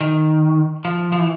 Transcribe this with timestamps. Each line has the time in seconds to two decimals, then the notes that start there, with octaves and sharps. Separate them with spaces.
0.01 D#3
0.85 F3
1.12 F3
1.19 E3